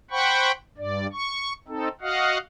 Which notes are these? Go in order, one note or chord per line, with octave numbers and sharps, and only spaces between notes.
C5 F#5 G5 B5 C#6
G2 D5
C#6
C4 D#4 A4
F#4 D#5 F5 F#5